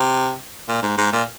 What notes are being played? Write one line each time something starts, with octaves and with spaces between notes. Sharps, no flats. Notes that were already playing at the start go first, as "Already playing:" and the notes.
Already playing: C3
A#2
G#2
G#2
A#2